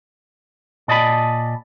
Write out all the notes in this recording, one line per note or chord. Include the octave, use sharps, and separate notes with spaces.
A#2 D5 D#5 A5 B5